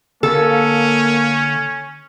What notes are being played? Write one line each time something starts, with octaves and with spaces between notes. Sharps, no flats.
D3 A#3 C#4 A4